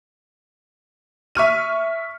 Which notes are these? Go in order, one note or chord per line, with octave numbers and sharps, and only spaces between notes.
E5 C#6 F6 D#7